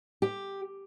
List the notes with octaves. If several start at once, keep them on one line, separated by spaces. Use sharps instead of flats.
G4